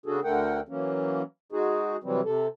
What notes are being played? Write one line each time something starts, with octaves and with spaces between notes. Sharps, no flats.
C#3 D4 F#4 G#4 A4
D2 D3 A3 A#4 F#5 G5
E3 F#3 A#3 C#4
G#3 D#4 F#4 G#4
C3 E3 F#3 G3 C4
C3 A4